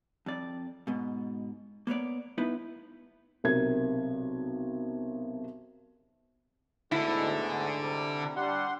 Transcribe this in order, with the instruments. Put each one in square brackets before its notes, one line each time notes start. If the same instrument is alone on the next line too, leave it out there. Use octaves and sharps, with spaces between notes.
[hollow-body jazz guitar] F2 D5
G#2 B2
A#3 B3 C#5 D5
B3 D#4 E4 B4
[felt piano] B1 C3 A#4 G#6
[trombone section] D2 G#2 [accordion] B2 [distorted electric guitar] D3 [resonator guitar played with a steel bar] E4
[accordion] C3 G3
[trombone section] G3 D4 [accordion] F#5 C6